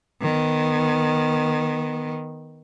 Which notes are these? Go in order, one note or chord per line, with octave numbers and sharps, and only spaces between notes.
D#3 B3